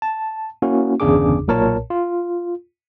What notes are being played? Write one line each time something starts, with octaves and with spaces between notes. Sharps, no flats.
A5
A#3 C#4 E4 F#4
G1 E2 C#3 D4 G#4 D6
B1 A#2 A#4 C#5 A5
F4